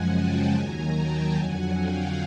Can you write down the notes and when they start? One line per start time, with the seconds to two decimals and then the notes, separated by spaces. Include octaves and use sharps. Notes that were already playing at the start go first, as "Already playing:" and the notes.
Already playing: F#2 C#3 F3 G#3 F#5 G#5
0.11 G5 A5
0.52 D#2 D#3 F#3 G#5 A#5
0.94 G5 A5
1.35 F2 D3 F#3 F#5 G#5
1.77 F5 G5